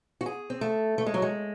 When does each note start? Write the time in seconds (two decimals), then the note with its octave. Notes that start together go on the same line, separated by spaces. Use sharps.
0.21 F#4
0.26 G#4
0.50 C4
0.61 A3
0.98 A3
1.06 G#3
1.14 F#3
1.22 G#3